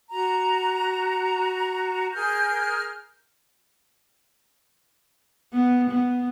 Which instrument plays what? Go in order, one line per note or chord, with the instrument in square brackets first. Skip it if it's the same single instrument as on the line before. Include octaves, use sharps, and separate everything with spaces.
[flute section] F#4 A#5
G#4 A#4 F6 G6
[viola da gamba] B3
B3